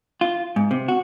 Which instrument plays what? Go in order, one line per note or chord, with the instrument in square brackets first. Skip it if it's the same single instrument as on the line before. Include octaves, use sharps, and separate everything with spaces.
[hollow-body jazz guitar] F4
G#2
C3
F#4